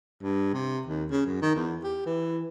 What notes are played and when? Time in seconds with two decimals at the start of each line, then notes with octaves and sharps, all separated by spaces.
0.22 G2
0.54 C3
0.87 D#2
1.10 C#3
1.26 F#2
1.42 D#3
1.55 E2
1.84 G4
2.06 E3